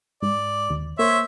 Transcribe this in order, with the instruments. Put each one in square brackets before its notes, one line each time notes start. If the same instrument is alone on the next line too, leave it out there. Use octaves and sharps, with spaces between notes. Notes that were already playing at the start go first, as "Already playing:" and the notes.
[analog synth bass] G#2 [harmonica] D5
[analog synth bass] D#2
[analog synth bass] A#3 [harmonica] C5 C#5 E5